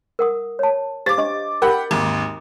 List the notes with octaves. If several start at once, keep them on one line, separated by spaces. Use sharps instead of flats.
A#4 F#5 D#6
C#5 A5
G4 C5 F5 D6 A6
D4 D#5 C#6
G4 A#4 F#5 B5
G#1 D#2